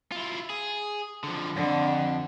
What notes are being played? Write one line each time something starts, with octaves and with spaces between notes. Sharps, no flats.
E4 F4
G#4
D3 F3
F2 D3